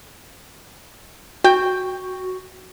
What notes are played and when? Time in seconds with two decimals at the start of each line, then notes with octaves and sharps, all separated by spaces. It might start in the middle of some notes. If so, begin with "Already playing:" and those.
1.44 F#4 G5